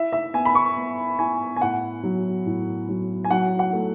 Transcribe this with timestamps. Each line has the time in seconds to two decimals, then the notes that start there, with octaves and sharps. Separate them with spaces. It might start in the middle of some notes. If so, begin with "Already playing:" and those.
Already playing: E4 E5
0.13 E5
0.34 B3 G#5
0.45 B5
0.55 C#6
0.76 B3
1.19 E4 G#5
1.56 G#5
1.61 A2 F#5
2.03 F#3
2.46 A2
2.89 F#3
3.24 G#5
3.30 F#3 F#5
3.59 F#5
3.73 A3